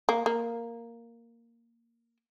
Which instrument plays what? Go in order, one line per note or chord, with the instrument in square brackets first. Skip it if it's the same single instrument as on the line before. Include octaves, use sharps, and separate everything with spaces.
[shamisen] A#3
A#3